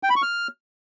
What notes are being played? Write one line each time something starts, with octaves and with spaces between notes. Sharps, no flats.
G5
B5
C#6
F6